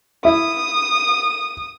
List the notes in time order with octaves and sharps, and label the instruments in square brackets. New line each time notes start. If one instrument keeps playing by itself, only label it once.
[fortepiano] E4 [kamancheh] D#6